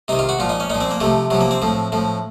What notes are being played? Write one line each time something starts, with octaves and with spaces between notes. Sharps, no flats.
C3 D#3 D#4
F4
F#4
A#2 F3 F4
D#4
C#4
A#2 F3 D#4
C4
A#3
C3 F3 A3
C3 F3 F#3
A#3
C4
A2 F3
A2 F3